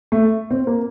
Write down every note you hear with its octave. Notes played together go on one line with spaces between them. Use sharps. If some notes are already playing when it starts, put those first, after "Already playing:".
A3
C4
A#3